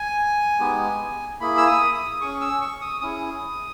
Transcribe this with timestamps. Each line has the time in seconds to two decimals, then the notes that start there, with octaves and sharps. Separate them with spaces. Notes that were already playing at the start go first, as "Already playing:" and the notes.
Already playing: G#5
0.60 G#3 B3 D#4 G4
1.40 A#3 E4 G#4 B5
1.57 E6
1.67 D#6
1.94 D#6
2.21 C#4 G#4 C#6
2.41 E6
2.61 C#6
2.81 D#6
3.01 C#4 E4 G#4 D#6